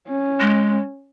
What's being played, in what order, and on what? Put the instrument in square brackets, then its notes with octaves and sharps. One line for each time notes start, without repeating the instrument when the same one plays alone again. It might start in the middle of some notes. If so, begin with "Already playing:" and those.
[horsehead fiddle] C#4
[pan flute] G#3